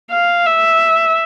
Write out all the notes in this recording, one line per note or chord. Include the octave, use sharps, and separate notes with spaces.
F5
E5